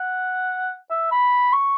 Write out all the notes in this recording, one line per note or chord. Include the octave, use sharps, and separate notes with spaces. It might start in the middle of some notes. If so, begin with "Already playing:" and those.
Already playing: F#5
E5
B5
C#6